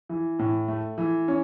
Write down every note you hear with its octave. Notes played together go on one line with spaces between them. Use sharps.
E3
A2
A3
E3
C#4